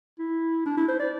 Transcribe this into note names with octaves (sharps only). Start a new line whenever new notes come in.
E4
D4
E4
C5
D5